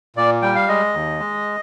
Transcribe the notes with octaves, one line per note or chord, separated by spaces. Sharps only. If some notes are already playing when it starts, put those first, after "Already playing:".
A#2 D5
G3 G5
F5
G#3 D#5
D#2
G#3